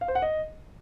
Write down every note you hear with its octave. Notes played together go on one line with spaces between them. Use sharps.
F5
C5
F#5
D#5